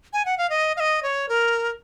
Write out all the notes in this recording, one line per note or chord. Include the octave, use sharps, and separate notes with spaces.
G#5
F#5
F5
D#5
F5
D#5
C#5
A#4